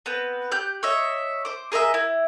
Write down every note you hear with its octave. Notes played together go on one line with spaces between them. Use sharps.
B3 C4 B4
G4 F#6 G6
C#5 D#5 E5
C5 D6
G#4 A#4 D#5 E5
E4